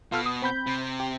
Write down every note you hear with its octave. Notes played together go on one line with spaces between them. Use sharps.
B2 F4 A4 F6
D#6
C4 B5 G6
C3
G4